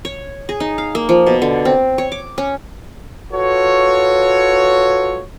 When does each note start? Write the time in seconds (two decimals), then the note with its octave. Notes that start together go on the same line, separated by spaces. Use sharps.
0.05 C#5
0.49 G#4
0.60 D#4
0.78 F5
0.95 A#3
1.09 F3
1.27 B2
1.42 D3
1.65 C4
1.98 C#5
2.12 D6
2.38 C#4
3.32 F4 F#4 A4 B4 C#5